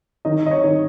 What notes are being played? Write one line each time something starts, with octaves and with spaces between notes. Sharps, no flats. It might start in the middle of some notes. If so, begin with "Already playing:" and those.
D#3 D#5
D#5
C#5
D#3